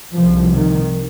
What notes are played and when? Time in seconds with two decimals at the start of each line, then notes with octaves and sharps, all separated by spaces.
0.16 C2 C3 F3
0.53 D#3